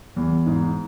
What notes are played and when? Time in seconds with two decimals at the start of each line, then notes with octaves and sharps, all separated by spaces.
0.16 E2
0.46 G#2